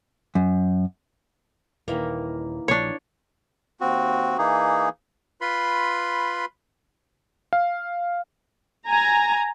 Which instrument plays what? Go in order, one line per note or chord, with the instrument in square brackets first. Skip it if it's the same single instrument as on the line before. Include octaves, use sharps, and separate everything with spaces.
[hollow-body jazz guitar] F#2
[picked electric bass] D#1 [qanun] D#3 E3 A#3
[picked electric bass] A#1 [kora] D4 C#5
[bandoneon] D#2 C4 F#4
E3 A#3 D#4 G#4
[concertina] F4 B4 B5 C6
[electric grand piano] F5
[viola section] G#5 A#5